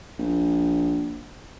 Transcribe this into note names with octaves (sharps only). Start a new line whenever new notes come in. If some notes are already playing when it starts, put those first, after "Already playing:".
A#1